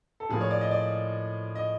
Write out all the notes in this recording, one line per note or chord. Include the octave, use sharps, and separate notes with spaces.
A4
A2 F3 A#3 G#4
C#5
D5
D#5
D5
D#5